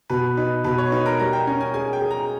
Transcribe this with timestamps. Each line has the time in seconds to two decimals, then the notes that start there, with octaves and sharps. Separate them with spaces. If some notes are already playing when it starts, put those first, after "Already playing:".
0.10 B2 B4
0.37 D#4 B4
0.64 B2 B4
0.78 C#5
0.92 D#4 B4
1.06 A#4
1.19 G3 A#4
1.33 G5
1.47 C#4 G#5
1.60 G#5
1.74 G#4 G#5
1.93 G5
2.02 G#4
2.11 A#5